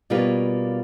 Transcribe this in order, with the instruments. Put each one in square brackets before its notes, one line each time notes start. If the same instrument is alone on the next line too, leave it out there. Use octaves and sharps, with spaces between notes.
[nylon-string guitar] B2 G3 A#3 F4 B4 C#5